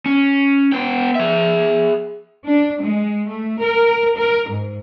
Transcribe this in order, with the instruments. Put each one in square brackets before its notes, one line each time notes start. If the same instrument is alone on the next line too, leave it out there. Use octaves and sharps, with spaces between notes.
[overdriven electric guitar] C#4
B3 G5
G#4 E5
[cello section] D4
G#3
A3
A#4
A#4
G#2